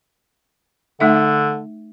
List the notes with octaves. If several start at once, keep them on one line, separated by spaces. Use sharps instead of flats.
D3 A3 D#4 E5